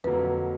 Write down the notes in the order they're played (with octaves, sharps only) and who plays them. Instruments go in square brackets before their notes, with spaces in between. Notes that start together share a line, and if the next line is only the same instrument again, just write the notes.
[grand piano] F2 D3 F#3 A#3 [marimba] B4